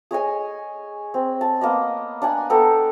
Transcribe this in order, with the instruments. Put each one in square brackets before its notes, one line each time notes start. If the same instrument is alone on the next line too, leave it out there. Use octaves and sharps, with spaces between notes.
[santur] G#4 C#5 D#5 G#5
C4
A5
A#3 B3 D#5
D4 F#5 G#5
B3 A4 G5 A#5